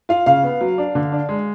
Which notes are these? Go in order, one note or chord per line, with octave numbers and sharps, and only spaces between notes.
F4 F5
C#3 F5
B3
F#3
D4
D3
D4
G#3